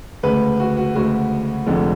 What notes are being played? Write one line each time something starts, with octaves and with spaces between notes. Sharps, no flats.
D2 C#3 G#3 B4
F#4
F#4
D2 C#3 G#3 F#4
F1 F2 D3 G#3